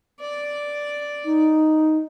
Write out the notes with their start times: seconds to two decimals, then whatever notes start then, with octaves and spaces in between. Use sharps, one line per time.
0.20 D5
1.25 D#4